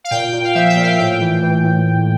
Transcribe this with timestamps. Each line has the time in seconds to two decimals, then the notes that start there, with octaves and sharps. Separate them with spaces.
0.04 F5
0.11 A#2 G5
0.33 A#2
0.45 F5
0.55 F3 E5
0.69 G5
0.76 A#2
0.83 F5
0.98 A2 G5
1.21 E3
1.42 E3
1.64 A2